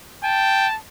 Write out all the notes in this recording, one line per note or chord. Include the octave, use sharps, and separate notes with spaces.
G5 A5